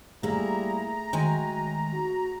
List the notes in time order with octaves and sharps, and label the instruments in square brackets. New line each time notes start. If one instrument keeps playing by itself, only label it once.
[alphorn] G3 [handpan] A3 G#4 [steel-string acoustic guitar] A#3 E4 [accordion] A#5
[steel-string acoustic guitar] D#3 G#3 G#5 [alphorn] F#3
[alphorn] F#4